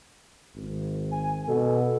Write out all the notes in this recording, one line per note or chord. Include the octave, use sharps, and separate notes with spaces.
G#1
G#5
B2 A4